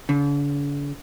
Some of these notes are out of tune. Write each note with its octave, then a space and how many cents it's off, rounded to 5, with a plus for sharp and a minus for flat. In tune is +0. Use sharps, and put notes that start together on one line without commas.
D3 -45